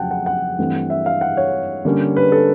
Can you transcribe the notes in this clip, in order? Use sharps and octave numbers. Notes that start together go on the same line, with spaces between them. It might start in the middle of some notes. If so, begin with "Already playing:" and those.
Already playing: F2 C#3 F#3 F#5 G5 A5
F#5
F#5
G2 E3 A3 C4
E5
F5
F#5
C#5
D3 G3 A#3 C#4
B4
A4